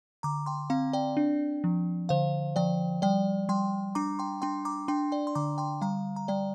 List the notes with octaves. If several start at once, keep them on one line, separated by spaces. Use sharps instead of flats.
D3 A#5 D6
G5 C6
C4 F5 A#5
D5 G5
D4
F3
D3 C5 F5
F3 D5 G5
G3 D5 G5
G3 G5 C6
D4 A#5 D6
G5 C6
D4 G5 C6
A#5 D6
D4 G5 C6
D5 G5
C6
D3 A#5 D6
G5 C6
G3 F5 A#5
A#5
G3 D5 G5